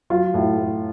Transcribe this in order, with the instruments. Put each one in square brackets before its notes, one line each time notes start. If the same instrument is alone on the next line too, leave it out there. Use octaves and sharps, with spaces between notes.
[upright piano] F#3 F4
A2
A2